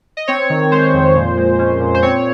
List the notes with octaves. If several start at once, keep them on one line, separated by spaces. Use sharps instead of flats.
D#5
C4 C#5
D#3
G#3 C5
F2
A#2
G#3
C#4
A#2
C5
C4 C#5